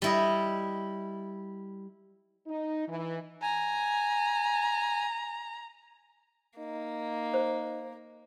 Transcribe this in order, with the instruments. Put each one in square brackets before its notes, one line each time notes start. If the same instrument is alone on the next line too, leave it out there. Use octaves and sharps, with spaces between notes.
[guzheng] G3 E4 D#5
[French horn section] D#4
E3
[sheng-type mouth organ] G#5 [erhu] A#5
[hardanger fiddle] A#3 [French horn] D#4
[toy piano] C5